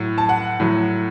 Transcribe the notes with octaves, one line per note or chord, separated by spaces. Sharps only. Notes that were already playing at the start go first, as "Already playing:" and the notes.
Already playing: A2 F#3
A5
F#5
A2 F#3